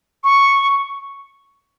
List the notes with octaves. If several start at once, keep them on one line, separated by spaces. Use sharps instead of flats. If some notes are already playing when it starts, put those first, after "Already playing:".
C#6